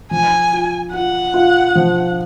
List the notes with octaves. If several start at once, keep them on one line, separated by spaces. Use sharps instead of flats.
F3 G#5
F4
F4 F#5
F4
F3